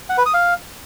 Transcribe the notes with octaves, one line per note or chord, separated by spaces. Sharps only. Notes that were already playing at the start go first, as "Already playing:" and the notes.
F#5
B4
D#6
F5